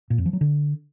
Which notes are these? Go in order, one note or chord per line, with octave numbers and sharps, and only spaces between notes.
A#2
F2
F3
F#3
D3